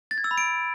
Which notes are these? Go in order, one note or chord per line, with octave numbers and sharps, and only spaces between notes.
A6
G#6
E6
B5
D7